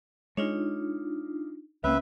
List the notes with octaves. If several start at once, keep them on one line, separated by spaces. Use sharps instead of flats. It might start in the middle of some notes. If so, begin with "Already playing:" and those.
G#3 D4 D#4 F4 C#5
C#2 A#3 C4 C#4 B4 E5